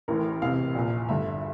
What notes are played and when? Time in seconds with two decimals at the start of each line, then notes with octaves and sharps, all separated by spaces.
0.08 A1 A2 E3 A#4
0.42 E1 E2 C3 F5
0.75 A#1 A#2
1.08 G1 G2 D3 E5